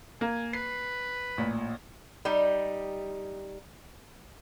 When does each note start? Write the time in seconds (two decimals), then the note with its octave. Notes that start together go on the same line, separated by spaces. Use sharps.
0.21 A#3 G#5
0.53 B4 C7
1.38 A1 A#2
2.25 G3 D#4 G4